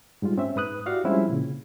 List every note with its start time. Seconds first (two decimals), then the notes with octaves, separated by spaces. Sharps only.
0.22 G#2 G3 G#3 F4
0.38 C4 C#4 E5
0.56 G#2 B4 D#6 F#6
0.86 E4 F#4 G4 D5 F5 F#5
1.04 F3 G3 G#3 C4 C#4 E4
1.29 A#2 C#3